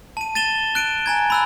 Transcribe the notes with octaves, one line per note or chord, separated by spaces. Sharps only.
A5 D#7
A6 D#7 E7 G7
F#6 D7 D#7
G#5 A#5 G#6
B5 E6 F#6